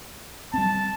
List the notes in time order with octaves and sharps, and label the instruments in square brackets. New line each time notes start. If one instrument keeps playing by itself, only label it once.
[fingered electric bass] G3 C4 [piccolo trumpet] A5